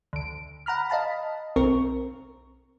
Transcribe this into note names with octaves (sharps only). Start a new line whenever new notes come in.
D2 D7
F#5 A#5 B5 F6
D#5 F5 A5 B5
B1 C4 A#4 C#6